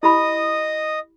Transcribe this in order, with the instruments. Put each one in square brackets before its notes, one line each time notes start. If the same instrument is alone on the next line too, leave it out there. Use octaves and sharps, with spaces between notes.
[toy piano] E4 G4 B5 [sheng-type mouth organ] D#5 D#6